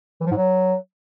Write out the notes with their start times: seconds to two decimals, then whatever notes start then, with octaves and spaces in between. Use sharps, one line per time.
0.21 E3
0.26 F3
0.31 G#2
0.37 F#3